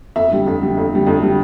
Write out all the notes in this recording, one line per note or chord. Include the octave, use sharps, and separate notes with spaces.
F2 E5
D3 G3
F2
D3 G3
F2
D3 G3
F2
D3 G3